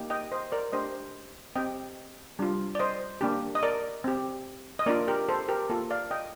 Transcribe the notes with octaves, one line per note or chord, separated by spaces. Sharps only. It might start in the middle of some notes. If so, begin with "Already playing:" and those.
Already playing: A#3 D#4 G4
D#5 G5
C5 D#5
A#4 D5
A3 D4 G4 C5 D#5
C4 G4 D#5 G5
G3 D4 F4
D5
C5 D#5
A#3 D4 G4
D#5
A#4 D5
C4 G4
D#5
A#3 D4 F4 A#4 D5
G4 A#4
A4 C5
G4 A#4
A#3 F4 A4
D5 F5
D#5 G5